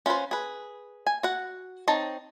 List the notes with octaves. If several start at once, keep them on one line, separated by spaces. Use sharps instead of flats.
C#4 F4 F#4 B4 C5
G#4 B4
G#5
F#4 F#5
C4 D#4 C#5 A5